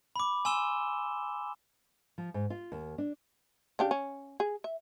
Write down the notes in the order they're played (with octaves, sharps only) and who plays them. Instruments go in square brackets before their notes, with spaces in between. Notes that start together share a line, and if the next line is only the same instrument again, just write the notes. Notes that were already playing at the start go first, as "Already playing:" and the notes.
[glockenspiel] B5 D6
G#5 C6 E6 E7 G7
[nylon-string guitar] F3
G#2
F4
D#2
D4
[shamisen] C#3 D4 G4
C#4
G#4
E5